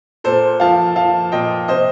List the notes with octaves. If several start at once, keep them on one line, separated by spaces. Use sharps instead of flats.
A#2 A4 C5
F3 F5 A5
F3 F5 A5
A#2 D#5 G5
C3 C5 D#5